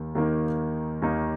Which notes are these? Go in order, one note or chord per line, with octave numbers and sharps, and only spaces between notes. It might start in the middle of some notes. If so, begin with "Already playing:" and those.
Already playing: D#2 D#3 A#3
D#2 D#3 A#3 D#4
D#2 D#3 A#3 D#4